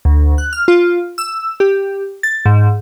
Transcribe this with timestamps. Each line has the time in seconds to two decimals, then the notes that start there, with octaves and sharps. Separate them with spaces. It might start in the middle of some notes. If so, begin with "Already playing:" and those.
0.05 D2
0.38 F#6
0.53 F6
0.68 F4
1.18 E6
1.60 G4
2.23 A6
2.46 G#2